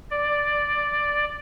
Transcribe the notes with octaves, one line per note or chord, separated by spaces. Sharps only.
D5